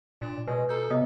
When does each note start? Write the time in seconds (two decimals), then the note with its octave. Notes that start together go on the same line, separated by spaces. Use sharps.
0.22 A#2 D4
0.48 B2 G#3 B4 G#5
0.69 A4 A#5 G6
0.90 C3 B3 D#5 D#6